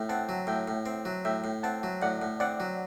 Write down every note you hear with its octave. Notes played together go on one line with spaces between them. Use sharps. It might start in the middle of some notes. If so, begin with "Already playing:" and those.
Already playing: A2 E5 G5
C4 F#5 A5
F#3
A2 E5 G5
A2
C4
F#3
A2 E5 G5
A2
C4 F#5 A5
F#3
A2 D5 F#5
A2
C4 D5 F#5
F#3